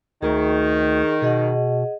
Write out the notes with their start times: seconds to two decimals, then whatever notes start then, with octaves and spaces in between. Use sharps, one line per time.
0.23 D2 D#3 G#4 C#6
1.22 B2 G#4 D#5 F#5